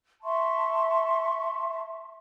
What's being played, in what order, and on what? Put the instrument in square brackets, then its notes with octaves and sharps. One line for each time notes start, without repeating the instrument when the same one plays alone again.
[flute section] E5 A5 C6 C#6